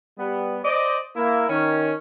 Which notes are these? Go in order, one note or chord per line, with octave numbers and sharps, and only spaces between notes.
G3 B3
C5 D5 D#5
A#3 E4
D#3 C#4